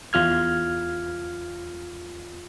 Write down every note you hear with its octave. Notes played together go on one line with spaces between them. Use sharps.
E2 F4 F6 G#6